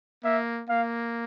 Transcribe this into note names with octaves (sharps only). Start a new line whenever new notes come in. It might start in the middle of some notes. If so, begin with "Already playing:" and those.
A#3 E5
A#3 F5